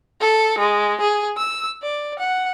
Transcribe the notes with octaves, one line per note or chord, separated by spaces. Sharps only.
A4
G#3
G#4
E6
D5
F#5